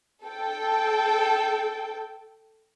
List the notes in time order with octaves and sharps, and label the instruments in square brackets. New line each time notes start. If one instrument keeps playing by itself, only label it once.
[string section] A4 G5